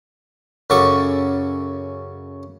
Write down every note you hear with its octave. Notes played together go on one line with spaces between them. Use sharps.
F#2 C#3 C#4 A4 C#6 D6